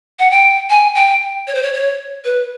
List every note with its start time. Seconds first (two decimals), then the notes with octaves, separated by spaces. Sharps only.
0.19 F#5
0.31 G5
0.70 G#5
0.95 G5
1.47 C#5
1.55 C5
1.63 C#5
1.73 C#5
2.25 B4